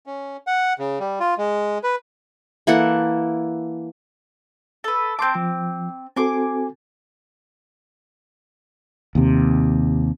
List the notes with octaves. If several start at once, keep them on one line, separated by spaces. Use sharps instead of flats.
C#4
F#5
C#3
G3
F4
G#3
B4
E3 A#3 A4 F#5
A4 B4
C4 A5 C6 D6 G6
F3
C4 F#4 A4 G#5 C6 D6
D#2 C3